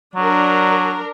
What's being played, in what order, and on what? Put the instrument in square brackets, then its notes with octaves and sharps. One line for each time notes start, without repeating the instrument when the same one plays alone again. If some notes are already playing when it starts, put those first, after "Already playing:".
[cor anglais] F#3 [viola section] D4 A#4